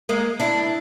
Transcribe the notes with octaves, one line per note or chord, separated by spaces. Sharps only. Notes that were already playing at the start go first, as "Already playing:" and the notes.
G#3 A#3
D4 E4